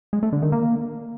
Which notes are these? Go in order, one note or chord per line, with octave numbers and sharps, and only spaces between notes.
G#3
A3
D3
D#3
A#3